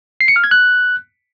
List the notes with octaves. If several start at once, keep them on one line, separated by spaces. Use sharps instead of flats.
C7
C#7
F6
G#6
F#6